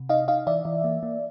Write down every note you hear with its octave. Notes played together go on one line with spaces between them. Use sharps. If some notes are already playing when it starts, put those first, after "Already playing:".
Already playing: C3
D#4 D#5 F5
D#4 D#5 F5
E3 D5 E5
E3
A#3
A#3